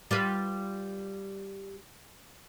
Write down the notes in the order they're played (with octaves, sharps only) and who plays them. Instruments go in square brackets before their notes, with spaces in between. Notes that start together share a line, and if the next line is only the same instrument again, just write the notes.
[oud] G3 F4 B4